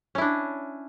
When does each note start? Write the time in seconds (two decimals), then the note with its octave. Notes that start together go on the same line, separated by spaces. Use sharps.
0.15 C#4
0.18 E4
0.21 D4